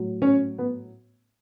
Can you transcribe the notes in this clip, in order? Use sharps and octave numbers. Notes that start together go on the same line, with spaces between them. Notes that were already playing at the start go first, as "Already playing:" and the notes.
Already playing: A2 F#3
C#4
B3